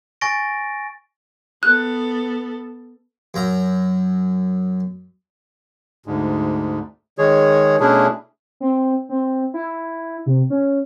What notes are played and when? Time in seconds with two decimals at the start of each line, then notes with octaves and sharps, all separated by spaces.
0.21 G#5 C#6 A6 A#6 D7
1.63 B3 A4 F#6
3.34 F#2 A#5
6.06 D2 G#2
7.18 D#3 G#3 G#4 C#5
7.80 B2 A3 C#4 D4 E4 G#4
8.60 C4
9.09 C4
9.54 E4
10.26 C3
10.50 C#4